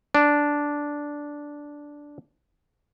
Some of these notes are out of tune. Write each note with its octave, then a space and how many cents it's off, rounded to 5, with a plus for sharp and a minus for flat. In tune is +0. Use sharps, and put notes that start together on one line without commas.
D4 -5